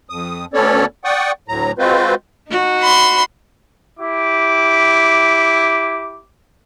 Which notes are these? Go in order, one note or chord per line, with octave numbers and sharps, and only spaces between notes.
F2 D#6
D2 B3 C#4 A4 C#5 D5
D5 F#5 G5 C#6 D#6
D2 A2 F#3 A#5
G#3 C4 F4 F#4 B4 C5
D#4 F#4
B5 C6
E4 G4 D6